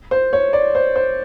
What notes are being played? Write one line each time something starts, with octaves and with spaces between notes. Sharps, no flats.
C5
C#5
D5
C5
C5